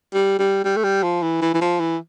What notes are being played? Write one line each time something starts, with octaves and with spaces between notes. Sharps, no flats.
G3
G3
G3
A3
G3
F3
E3
E3
E3
F3
E3